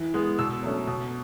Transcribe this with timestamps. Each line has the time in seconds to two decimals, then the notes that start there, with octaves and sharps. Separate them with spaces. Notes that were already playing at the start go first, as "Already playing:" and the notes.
Already playing: E3
0.14 G#3 B3
0.39 B2 E6
0.63 F#3 A3 C#4
0.87 B2